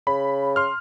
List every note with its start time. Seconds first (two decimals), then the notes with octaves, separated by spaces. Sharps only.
0.07 C#3 B5
0.56 C6 F6